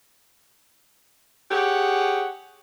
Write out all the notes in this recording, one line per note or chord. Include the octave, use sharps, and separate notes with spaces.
G4 G#4 C#5 F#5